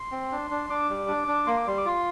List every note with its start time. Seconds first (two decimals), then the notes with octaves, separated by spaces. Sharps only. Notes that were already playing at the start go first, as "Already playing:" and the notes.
Already playing: C6
0.12 C4
0.32 D4
0.51 D4
0.70 D4 D6
0.89 G3
1.08 D4
1.28 D4
1.47 A#3 C6
1.57 D6
1.66 G3 C6
1.78 D6
1.85 F4 C6